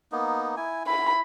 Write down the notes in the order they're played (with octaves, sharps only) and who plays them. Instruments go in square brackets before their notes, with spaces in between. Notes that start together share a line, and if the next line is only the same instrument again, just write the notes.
[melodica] A#3 B3 D#4
E4 G#5
[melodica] E4 [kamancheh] B5